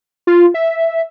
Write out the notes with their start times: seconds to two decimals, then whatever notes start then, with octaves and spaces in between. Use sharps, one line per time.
0.27 F4
0.54 E5